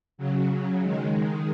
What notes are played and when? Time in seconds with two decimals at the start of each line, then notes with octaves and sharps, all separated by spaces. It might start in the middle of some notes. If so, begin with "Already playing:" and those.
0.18 C#3 F#3
0.82 D#3 G#3